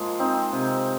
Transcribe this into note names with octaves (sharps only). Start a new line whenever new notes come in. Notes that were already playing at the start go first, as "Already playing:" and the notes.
Already playing: F3 G#3 A#3 F4
C4 D#4
C3